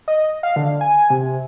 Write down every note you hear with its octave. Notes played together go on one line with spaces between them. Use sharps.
D#5
F5
D3
G#5
C3